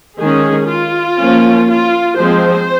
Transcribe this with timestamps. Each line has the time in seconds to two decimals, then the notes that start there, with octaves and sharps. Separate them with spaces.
0.19 D#3 G#3 C#4 G#4
0.69 F4
1.19 F3 A#3 C#4
1.69 F4
2.18 F3 G#3 C4 C5